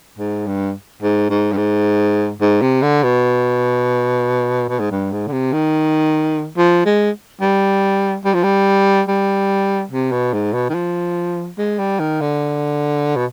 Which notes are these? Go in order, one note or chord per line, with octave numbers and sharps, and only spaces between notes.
G#2
G2
G#2
G#2
G2
G#2
G#2
C3
D3
B2
B2
G#2
G2
G#2
D3
C3
D#3
F3
G#3
G3
G3
F3
G3
G3
C3
B2
G#2
B2
D#3
F3
G#3
G3
D#3
D3
B2